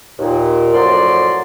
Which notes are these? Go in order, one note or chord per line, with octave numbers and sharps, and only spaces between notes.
D#2 A#2
F#2 A2 F3 F#3 D5 C6